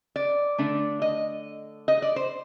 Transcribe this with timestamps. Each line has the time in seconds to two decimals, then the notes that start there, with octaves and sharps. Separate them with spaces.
0.16 D5
0.58 D3 A3 D4
1.02 D#5
1.88 D#5
2.02 D5
2.16 C5